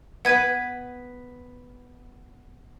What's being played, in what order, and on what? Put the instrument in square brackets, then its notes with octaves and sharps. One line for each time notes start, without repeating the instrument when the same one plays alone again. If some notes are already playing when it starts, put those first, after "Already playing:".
[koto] B3 B4 [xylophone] F#5 G#6 D#7